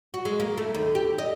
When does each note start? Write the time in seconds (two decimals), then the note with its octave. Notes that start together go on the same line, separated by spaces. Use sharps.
0.14 F#4
0.25 G#3
0.40 A#3
0.58 A3
0.74 D#2
0.95 G4
1.18 D#5